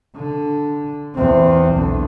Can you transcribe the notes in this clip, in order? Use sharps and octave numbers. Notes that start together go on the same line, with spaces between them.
D3
E2 C4
B1 D3